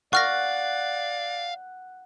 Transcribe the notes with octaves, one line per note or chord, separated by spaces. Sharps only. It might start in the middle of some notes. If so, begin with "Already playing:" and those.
D5 F5 F#5 C#6 F6 A#6